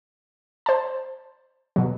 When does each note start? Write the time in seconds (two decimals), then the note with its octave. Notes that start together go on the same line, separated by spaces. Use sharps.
0.66 C5 A5
1.76 B2 F#3